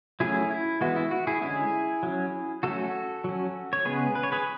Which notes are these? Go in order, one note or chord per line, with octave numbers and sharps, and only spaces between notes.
F#3 A3 C#4 E4 G#4
E4
E3 G#3 B3 F#4
E4
F#4
E4 G#4
D3 G#3 C#4 E4 G#4
F#3 C#4
F#3 A3 C#4 F#4 A4
F#3 C#4
C#5
C#3 G#3 B3 G#4 B4
B4
C#5
G#4 B4